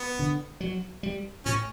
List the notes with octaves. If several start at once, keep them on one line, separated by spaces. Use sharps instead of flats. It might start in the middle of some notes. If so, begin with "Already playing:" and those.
Already playing: B3
D3
F#3
G3
A2 C#4